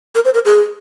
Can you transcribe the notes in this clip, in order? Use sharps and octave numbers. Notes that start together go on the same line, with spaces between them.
A#4
C5
A#4
G#4